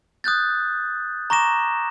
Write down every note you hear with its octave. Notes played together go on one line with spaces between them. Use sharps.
D#6 F#6 G6 A6
A#5 C#6 D6 A#6 E7
C#6